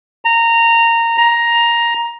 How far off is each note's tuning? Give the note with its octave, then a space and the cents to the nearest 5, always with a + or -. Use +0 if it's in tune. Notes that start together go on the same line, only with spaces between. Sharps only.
A#5 -15
A#5 +10